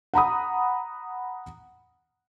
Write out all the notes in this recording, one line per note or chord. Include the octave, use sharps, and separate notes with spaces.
F#5 A#5 B5 D#6